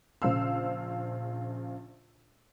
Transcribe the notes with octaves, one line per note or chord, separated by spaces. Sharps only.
A#1 C#3 C5 F5 E6